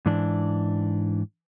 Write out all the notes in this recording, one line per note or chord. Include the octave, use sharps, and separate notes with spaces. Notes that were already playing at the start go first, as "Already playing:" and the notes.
G#2 E3 D4